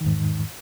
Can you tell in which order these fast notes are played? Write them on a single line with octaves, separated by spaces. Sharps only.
D#3 E2 G#2